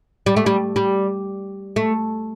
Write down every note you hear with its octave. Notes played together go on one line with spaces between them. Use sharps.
G3
A3
G3
G3
A3